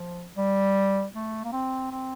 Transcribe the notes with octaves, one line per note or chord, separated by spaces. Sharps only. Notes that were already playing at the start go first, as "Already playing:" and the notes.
Already playing: F3
G3
A3
A#3
C4
C4